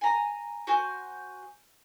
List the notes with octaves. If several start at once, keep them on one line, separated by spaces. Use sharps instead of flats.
G#5 A#5
F#4 C5 G#5